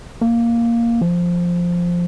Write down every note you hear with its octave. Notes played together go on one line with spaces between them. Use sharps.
A#3
F3